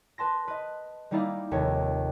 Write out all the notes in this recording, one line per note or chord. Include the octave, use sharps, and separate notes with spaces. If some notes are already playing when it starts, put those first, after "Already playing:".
B4 A5 C6 A#6
B4 D#5
G3 A#3 D#4 E4 D5 F5
F1 D#2 C#5